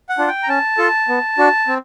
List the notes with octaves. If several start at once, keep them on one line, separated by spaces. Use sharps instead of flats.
F#5
D4 F4
G5
A#5
C#4 A5
F4 A4
B3
D4 F#4
C4